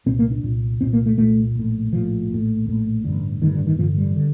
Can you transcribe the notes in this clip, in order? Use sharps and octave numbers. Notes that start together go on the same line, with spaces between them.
C2 A#2 C4
A#3
D4
C2 A#2
C2 A#2 C4
A#3
A3
C2 A#2 A3
A#1 A2
A#1 A2 F3
A#1 A2
A#1 A2
A1 G2 D3
A1 G2 D3 D#3
D3
D#3
A1 G2 D3 F3
G3
D3